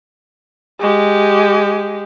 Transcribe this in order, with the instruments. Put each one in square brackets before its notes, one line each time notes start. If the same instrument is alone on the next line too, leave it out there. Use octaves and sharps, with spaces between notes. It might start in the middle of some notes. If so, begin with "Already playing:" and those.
[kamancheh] G#3 G4